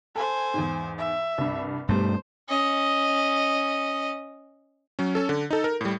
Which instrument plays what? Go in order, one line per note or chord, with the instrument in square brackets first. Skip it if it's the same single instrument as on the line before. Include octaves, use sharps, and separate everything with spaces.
[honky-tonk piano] A4 [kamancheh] C5 G#5
[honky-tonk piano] E2 G#2
[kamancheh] E5
[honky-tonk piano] C2 G2
[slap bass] G2 A3 [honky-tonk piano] B2 G3 [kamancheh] C5
[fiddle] C#4 D#5
[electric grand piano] F#3 C#4
C#4 A4
D3
D#4 A4
A#4
A2 G3